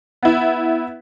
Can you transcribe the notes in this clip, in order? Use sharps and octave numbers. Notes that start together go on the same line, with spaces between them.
B3 E4